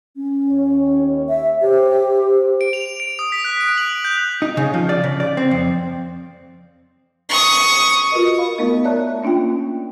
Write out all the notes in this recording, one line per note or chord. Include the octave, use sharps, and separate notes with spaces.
C#4
D#2 C#5
E5
G4 C5
D7
F7
F7
D7
D#6
B6
F#6
D7
F#7
F#7
G6
D#4
C#3
F3
D5
C#3
D5
C4
F2
C#6 D#6
F4 F#4 A#4 B4 D#5
F5 B5 C#6
A3 B3 D#4 A#4 D#5
C#5 D5 E5 A5 A#5 F#6
A#3 C#4 D4 F4 G5